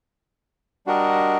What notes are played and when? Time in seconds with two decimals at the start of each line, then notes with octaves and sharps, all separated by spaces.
0.86 G3 D4 F#4 A#4 D#5